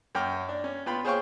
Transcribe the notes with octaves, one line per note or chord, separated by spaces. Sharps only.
F#2 G5 D6 F6
D4
C#4
B3 F4 G5 B5
G#4 C5 C#5 F5 G5 C#6